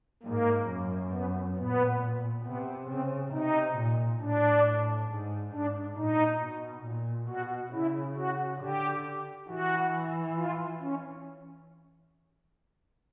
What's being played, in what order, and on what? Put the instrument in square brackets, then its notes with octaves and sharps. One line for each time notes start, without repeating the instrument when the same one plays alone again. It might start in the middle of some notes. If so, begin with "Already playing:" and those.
[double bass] G#2 [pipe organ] A#3
[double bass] F#2
[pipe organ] B3
[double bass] A#2 [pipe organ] B3
[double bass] C3 [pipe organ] B3
[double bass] C#3 [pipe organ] C4
[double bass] C3 [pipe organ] D#4
[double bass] A#2
[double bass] A2 [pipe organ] D4
[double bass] G#2
[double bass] G#2 [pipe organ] D4
[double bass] A#2 [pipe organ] D#4
[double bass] B2
A#2
[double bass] B2 [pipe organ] F#4
[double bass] C#3 [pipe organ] E4
[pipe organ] F#4
[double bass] D3 [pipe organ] G4
[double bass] E3 [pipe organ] F#4
[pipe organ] F4
C#4